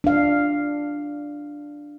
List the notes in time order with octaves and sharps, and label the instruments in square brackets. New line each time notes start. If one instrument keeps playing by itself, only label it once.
[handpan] D4 F5